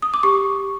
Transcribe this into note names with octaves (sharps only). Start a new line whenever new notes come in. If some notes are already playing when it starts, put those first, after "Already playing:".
D#6
D6
G4 C#6